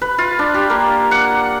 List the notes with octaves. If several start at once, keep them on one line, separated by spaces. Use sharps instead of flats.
B4
F4
D4
G4
A#3
F#5